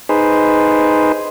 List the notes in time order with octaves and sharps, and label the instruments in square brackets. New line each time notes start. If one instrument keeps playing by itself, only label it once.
[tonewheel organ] D#4 G#4 B4 C5